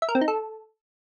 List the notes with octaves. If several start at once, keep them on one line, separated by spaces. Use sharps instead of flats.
E5
A#4
C4
D#4
A4